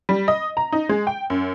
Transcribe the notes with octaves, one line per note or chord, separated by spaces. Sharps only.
G3
D#5
A#5
D#4
G#3
G5
F#2